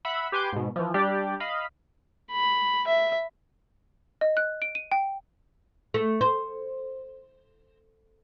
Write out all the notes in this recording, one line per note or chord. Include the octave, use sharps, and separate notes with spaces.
E5 F#5 B5
G4 B4 G#5 C6 D6 G6
G#2 B2
E3 F3
G3 D4 G4 D5
D#5 F5 B5
B5
E5
D#5
F#6
D7
D#7
G5
A3
C5